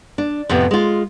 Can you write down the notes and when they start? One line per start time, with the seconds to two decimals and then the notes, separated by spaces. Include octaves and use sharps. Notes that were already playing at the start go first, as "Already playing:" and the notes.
0.18 D4
0.49 F2 A2 C3 B3
0.71 G#3 F4